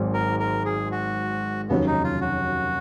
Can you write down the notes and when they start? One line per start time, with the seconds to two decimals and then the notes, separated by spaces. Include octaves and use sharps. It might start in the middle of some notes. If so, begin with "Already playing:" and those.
Already playing: G#1 G#2 F#3
0.14 A#4
0.40 A#4
0.65 G#4
0.91 F#4
1.69 F1 D#2 C#3 F#3 B3
1.87 D#4
2.04 F4
2.21 F#4